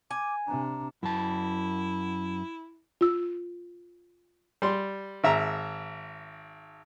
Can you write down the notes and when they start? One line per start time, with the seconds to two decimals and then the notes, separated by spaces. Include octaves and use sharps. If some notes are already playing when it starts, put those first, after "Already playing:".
0.11 G#5 D6
0.48 C3 D4 A#5
1.03 F#2 E4 A5
3.01 F4 E6
4.62 G3 C6
5.24 G#1 E5 A#5